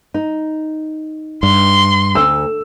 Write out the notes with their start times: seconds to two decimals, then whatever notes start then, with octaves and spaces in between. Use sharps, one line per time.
0.14 D#4
1.43 G2 C6
2.15 D2 E6